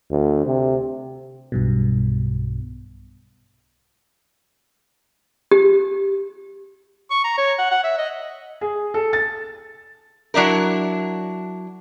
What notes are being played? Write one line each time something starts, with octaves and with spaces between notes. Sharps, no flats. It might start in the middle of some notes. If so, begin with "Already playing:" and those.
D2
C3
B1 G2 B2
G4
C#6
A#5
C#5
F#5
F#5
E5
D#5
G#4
A4
A6
F#3 D4 E4 A#4